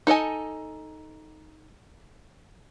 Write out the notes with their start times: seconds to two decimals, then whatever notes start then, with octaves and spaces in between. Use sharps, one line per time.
0.07 D#4 A4 D#5 G#5